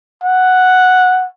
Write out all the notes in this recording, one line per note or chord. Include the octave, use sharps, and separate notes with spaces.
F#5